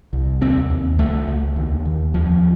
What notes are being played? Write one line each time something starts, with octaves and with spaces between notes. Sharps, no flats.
C2
D#2 C4
D#2
C#2 A3
C#2
D#2
D#2
F2 F3